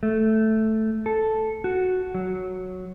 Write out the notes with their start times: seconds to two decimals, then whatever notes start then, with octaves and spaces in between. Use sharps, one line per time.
0.03 A3
1.06 A4
1.64 F#4
2.15 F#3